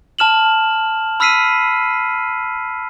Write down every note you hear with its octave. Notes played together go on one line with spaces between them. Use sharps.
A5 F6 E7 F#7
B5 E6 F6 B6 C7 D#7